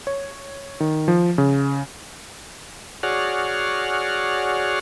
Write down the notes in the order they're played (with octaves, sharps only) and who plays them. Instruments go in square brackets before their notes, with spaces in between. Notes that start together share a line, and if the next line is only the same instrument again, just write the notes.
[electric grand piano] C#5
D#3
F3
C#3
[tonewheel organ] F#4 G#4 C#5 D5 F#5 F6